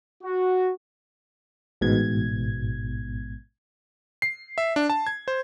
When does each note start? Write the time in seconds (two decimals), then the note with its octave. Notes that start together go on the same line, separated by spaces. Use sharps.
0.23 F#4
1.81 A1 G#2 B2 G#6
4.22 C7
4.58 E5
4.76 D4
4.90 A5
5.06 G#6
5.28 C5